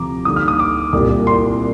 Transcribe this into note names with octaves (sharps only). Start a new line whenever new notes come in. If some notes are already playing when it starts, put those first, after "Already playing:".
Already playing: D2 C3 F3 A#5 D6
D2 D3 G3 A#3 D#4 D#6
F6
D#6
D6
C2 A#2 G3
C6